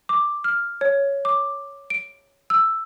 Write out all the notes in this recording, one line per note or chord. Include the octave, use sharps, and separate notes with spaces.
D6
F6
C#5
D6
D7
E6